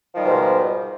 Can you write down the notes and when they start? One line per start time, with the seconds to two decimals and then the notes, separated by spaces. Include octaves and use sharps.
0.13 F3
0.16 D#3
0.18 G3
0.21 B2
0.24 G#2